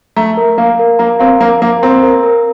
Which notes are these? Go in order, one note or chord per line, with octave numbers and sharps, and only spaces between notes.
A3 A#5
A#4
A#3 F5
A#4
A#3 A#5
C4 F5
A#3 A#5
A#3 A#5
C4 A#5
A#4
A#4